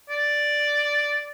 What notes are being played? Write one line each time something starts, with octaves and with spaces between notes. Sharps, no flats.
D5